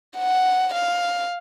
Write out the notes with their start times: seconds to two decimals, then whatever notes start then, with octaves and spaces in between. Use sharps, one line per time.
0.18 F#5
0.74 F5